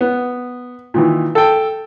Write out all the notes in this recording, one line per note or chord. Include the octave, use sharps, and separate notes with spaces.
B3
A#2 D#3 E3
A4 G5